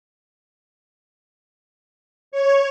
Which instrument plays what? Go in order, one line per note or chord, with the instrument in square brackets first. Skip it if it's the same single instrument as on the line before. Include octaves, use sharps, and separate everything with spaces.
[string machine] C#5